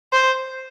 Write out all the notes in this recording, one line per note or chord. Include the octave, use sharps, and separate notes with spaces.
C5